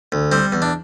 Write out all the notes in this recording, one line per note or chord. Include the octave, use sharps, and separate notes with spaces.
D2
G3 C4
E2
D4